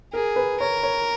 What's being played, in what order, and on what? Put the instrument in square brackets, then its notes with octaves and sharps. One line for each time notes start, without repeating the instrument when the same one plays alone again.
[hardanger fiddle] G#4 [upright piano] A#4
[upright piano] B4
[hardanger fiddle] A#4 [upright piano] C#5
[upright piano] C#5